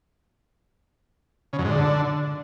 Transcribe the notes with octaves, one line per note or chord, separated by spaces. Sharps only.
C#3
F#2
G#2
D3